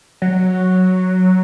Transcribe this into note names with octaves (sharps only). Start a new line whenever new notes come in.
F#3